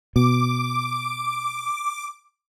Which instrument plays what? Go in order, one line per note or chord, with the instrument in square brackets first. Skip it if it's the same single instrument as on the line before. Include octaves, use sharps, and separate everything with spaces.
[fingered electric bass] B2 [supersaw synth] D6